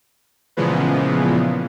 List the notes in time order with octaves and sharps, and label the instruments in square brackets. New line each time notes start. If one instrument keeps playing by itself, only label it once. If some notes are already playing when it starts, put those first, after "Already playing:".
[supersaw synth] A#2 C#3 E3 F3 G#3 B3